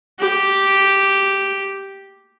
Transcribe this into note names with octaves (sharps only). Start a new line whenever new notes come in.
G4